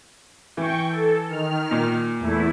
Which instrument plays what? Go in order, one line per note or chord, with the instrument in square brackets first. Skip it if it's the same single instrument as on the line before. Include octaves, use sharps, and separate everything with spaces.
[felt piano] E3 [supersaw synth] G5 C#6
[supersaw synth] A4
D#3 F6
[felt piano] A#2
[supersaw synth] E2 A3 E4